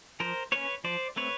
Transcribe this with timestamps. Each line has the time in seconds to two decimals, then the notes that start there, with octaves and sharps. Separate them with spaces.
0.20 F3 A#4 C5
0.52 A#3 C#4 B4 C#5
0.84 F3 C5 D5
1.16 A3 C4 B4 C#5